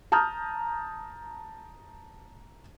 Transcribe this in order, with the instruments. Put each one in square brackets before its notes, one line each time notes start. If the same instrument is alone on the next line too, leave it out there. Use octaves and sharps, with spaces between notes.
[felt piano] A5 A#5 D#6 F6 G6